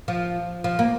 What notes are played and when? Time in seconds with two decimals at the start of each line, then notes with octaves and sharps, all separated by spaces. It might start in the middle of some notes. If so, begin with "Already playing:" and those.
0.08 F3
0.64 F3
0.79 A#3